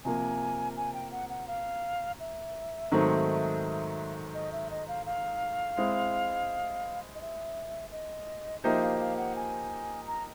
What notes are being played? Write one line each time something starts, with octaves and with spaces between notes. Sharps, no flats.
C3 F3 A#3 G#5
G#5
G5
F#5
F#5
F5
E5
G#2 D#3 F#3 A3 C4
D#5
E5
D#5
F5
F5
G#3 C4 E4
D#5
E5
D#5
F3 A#3 D#4 G4 C5 E5
F5
F5
F#5
G#5
A#5